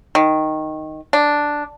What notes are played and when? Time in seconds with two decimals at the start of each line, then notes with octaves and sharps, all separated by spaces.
0.15 D#3
1.13 D4